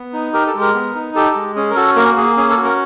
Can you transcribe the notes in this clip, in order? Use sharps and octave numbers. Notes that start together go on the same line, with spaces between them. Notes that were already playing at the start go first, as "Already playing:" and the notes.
Already playing: B3
D#4
G4 A#4
A4
G#3
A#4
B3
D#4
G4 A4
G#3
C#4 G#4
A#4
F#4 A4
A#3 A#4
A#3 G#4
C#4 G#4
A4
F#4
A#4